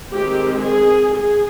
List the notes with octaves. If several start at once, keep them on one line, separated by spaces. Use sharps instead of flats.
D#3 G#3 C4 G4
G#4
G#4